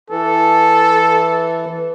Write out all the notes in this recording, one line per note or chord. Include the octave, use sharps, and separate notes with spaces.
E3 A4